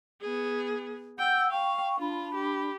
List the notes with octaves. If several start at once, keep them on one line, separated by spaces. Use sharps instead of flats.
B3 G#4
F#5 G5 E6 G6
F5 G5 C#6
D4 F4 B5
G4